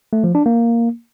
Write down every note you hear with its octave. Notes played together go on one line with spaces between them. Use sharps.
A3
F3
D4
A#3